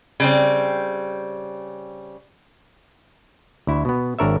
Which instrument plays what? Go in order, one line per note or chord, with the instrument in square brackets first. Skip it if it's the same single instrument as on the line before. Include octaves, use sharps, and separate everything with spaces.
[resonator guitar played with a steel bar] C#3 G3 C4
[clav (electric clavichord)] D2 E4
B2 B3
G#1 D4 A#4 C#5 E5